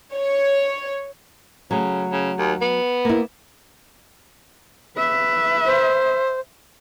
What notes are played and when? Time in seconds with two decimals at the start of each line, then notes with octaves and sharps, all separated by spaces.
0.15 C#5
1.71 C#3 F#3 A3
2.11 C#3
2.38 D#2
2.61 B3
3.05 A#3 E4
4.97 B4 E5
5.66 C5